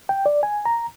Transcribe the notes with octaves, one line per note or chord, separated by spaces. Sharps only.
G5
D5
G#5
A#5